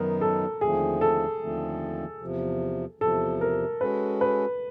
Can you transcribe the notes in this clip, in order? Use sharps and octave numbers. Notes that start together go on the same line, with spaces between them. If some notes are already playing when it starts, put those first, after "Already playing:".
Already playing: F#2 D#3 F#3 B3 D#4 A#4
A4
D#2 D3 F3 A3 C4 G#4
A4
D#2 D3 F3 A3 C4
E2 C3 F3
E2 C3 F3 A4
A#4
G#3 C#4 F#4 A4 B4
B4